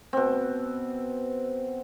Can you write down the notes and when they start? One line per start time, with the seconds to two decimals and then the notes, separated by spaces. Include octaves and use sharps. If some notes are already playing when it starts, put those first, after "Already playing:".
0.13 B2 C4